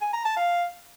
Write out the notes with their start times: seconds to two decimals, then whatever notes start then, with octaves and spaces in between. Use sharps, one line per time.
0.02 G#5
0.13 A#5
0.25 A5
0.37 F5